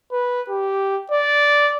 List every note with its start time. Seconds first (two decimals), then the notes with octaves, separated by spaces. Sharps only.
0.12 B4
0.49 G4
1.12 D5